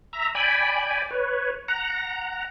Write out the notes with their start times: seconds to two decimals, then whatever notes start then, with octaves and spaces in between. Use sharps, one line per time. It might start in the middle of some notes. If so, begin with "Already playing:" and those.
0.13 E5 A#5
0.35 D5 G5 G#5 B5
1.11 B4 C#5
1.68 F#5 A#5